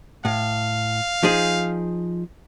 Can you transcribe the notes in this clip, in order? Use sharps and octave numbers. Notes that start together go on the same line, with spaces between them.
A2 F5
F3 D#4 G#4